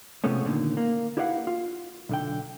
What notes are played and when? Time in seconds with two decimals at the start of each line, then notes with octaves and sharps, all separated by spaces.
0.24 C3 F3 G#3 A3 B3 C#4
0.45 A#2 D3 D#3
0.77 A#3
1.17 E4 G4 B4 D5 F5 F#5
1.47 F4
2.09 B1 D3 G5